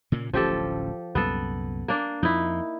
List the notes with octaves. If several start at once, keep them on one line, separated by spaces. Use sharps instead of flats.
A#2 C#3 A#3
D1 A1 F3 C#4 G4 A4
C2 F#2 A#2 B3 A4
A#3 D4
F2 F3 D#4 E4